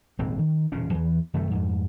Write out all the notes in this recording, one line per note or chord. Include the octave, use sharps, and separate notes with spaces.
D#1 G#1 G#2 C4
D#3
E1 A#2 C#3 C#4
E2 E3
F#2 C3 D#3 A3
F2 G#2